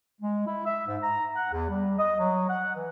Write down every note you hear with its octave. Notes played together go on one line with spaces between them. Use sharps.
G#3
E4
E5
G#2
A#5
F#5
E2
G3
D#5
F#3
F#5
E3